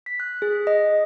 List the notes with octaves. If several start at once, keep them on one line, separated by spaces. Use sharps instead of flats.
B6
F#6
G#4
D#5